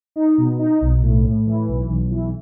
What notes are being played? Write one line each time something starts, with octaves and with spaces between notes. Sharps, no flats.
D#4
B2
D#4
B1
A2
A2
E3
B1
B1
E3